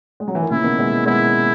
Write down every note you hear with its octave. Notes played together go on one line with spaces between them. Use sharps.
G#3
F#3
E3
D#3
A#2 C#3 E4
B2 D#3
G#3 B3
G#3 B3 E4